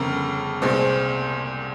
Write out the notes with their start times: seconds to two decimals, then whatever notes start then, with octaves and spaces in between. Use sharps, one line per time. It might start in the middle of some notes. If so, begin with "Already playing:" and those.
Already playing: G1 F2 C#3 A#4
0.62 C2 A#2 G#3 C4
0.74 C4